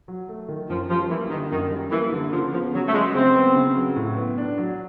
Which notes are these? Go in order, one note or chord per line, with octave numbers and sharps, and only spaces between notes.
F#3
A3
D#3
F#2 F3
F3 G3
E3 A#3
D3 D#3
F#2 D#3
G3
E3 A#3
D3
C#3 F3
F3 B3
C#3 F#3
A3
F#3 G#3
C#3 C4
B3
C#3
F#3
A2
B3
D4
F#3